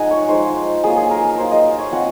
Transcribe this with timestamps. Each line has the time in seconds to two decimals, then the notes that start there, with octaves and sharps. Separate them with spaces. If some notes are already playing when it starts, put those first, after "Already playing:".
Already playing: F3 G#3 D#4 D#5 F#5 G#5
0.11 C#5
0.28 F3 G#3 D#4 C5
0.84 F#3 A#3 F4 G#4
0.96 G#4
1.11 A#4
1.24 A#4
1.38 F#3 A#3 F4 C5
1.51 D#5
1.78 C#5
1.92 F3 C4 F4 F#5